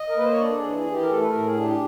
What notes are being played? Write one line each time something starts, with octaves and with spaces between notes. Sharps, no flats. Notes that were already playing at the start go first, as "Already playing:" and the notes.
Already playing: D#5
A#4
A#3 B4
C5
C#5
D4 D5
A4
G#4
E3
G#4
E3
G4
A#4
A3 A4
B4
A#4
A2
G#4
D4
G4